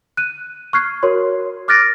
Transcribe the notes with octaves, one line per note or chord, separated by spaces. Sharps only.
F#6 D#7
C#6 F6 F#6 G#6 C7
F#4 A#4 C#5 C6
D6 F6 F#6 A6 A#6 D7